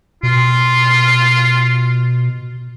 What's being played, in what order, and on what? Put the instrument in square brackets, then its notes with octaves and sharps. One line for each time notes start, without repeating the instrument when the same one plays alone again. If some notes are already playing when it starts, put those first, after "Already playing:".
[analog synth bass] B2 [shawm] F4